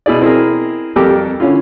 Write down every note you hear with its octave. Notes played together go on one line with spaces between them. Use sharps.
B2 E4 G#4 D5
C4 E4 G#4 A#4
F2 G3 G4 A4 A#4 D6
D3 C#4 E4 F4